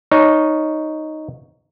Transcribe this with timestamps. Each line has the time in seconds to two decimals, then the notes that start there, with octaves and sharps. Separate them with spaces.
0.11 D#4 C#5